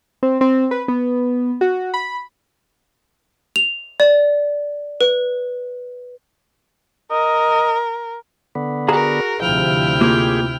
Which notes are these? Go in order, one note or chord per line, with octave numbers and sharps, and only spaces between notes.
C4
C4
B4
B3
F#4
B5
F7
D5
B4
A#4 D#5
D3 B3
F#4 G#4 A#4 A#5
D2 C3 F3 E4 G5 F6
A#3 F4 G4 G#4